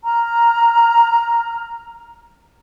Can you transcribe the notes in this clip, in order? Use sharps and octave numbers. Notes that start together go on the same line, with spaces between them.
A#5 F6